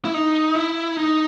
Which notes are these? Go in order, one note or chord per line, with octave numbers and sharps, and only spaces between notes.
E4
D#4
E4
D#4